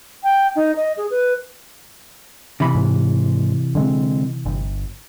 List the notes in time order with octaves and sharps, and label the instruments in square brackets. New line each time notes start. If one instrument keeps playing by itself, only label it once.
[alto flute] G5
D#4
D#5
G#4
B4
[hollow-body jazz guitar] C3 E3 B5
[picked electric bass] G#2
D3 G#3 C4
G1